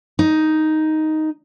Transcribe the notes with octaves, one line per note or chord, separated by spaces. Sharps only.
D#4